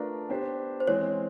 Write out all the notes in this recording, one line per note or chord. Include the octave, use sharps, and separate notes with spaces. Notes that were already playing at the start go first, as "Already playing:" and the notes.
Already playing: A3 D4 F4 A#4 B4 D5
B3 D4 G4 C5
C5
E3 G#3 C4 C#5